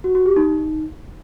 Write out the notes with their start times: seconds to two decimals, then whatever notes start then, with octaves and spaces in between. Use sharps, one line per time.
0.04 F#4
0.15 F#4
0.26 G4
0.36 D#4